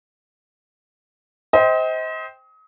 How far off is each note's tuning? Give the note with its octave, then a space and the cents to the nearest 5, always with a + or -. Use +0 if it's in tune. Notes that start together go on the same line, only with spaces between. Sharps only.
C5 -5 D#5 +35 G5 +0